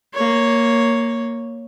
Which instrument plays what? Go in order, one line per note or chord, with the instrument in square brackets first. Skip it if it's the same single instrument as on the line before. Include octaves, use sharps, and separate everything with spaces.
[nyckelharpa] A#3 C#5